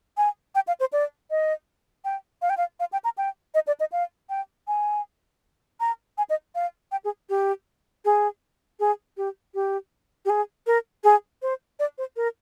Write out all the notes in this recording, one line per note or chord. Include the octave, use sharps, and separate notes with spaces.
G#5
G5
F5
C5
D5
D#5
G5
F5
G5
F5
F5
G5
A#5
G5
D#5
D5
D#5
F5
G5
G#5
A#5
G#5
D#5
F5
G5
G#4
G4
G#4
G#4
G4
G4
G4
G#4
A#4
G#4
C5
D5
C5
A#4